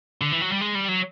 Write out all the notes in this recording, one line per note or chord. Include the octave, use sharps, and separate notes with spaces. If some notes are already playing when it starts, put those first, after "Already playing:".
D3
E3
F#3
G3
G#3
G3
F#3